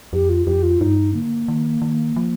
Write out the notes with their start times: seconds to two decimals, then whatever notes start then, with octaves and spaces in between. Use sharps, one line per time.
0.13 F2 G4
0.30 F4
0.46 F2 G4
0.63 F4
0.80 G2 D#4
1.14 D3 A#3
1.48 D#3
1.82 D#3
2.16 F3